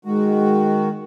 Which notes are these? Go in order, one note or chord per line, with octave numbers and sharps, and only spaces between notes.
D#3 G#3 F#4